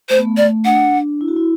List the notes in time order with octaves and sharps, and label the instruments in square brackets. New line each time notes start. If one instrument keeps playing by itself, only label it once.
[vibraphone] A3 [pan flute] C5
[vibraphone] B3
A3
[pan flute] D5
[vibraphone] D4 [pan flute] F#5
[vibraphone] E4
F#4
E4